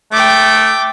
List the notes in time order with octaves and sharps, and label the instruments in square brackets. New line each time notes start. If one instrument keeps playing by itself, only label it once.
[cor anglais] A3 [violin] G5 D6